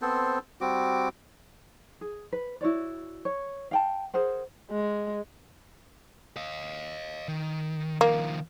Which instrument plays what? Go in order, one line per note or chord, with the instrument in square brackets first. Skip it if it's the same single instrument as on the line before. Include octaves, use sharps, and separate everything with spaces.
[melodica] B3 C4 A4 C5
G3 C4 F#4 D6
[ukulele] G#4
B4
E4 F#4 C#5 D5
C#5
F5 G5 A5
G#4 A#4 C5 F#5
[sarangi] G#3
[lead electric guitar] D#5 F5
D#3
[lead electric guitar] D#3 F3 [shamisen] A#3